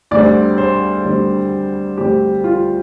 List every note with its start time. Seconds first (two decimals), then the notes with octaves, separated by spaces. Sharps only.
0.11 D2 D3 G3 C4 D5
0.58 C5
1.04 D2 D3 G3 C4
1.98 D2 D3 G3 C4 G4
2.44 F4